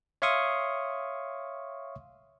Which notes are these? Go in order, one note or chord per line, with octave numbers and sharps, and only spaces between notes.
C#5 E5 F5 C6 C#6 D#6